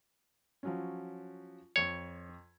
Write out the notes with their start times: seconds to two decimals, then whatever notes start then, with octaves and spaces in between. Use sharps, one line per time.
0.63 F3 F#3 C#4
1.76 F2 C#5 C#6 G#6